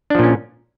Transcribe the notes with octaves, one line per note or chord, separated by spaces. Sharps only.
A#2 F3 C#4 D4